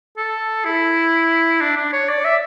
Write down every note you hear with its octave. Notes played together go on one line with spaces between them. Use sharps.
A4
E4
D4
D4
C#5
D5
E5